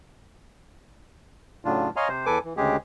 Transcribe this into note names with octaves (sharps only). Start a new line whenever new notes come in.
A2 C#3 F#3 D4 F4
C#5 D#5 F5 G#5 A#5 C6
C3 C5
E2 A4 B4 G#5 D6
E3
D2 C#3 G#3 G4 G#4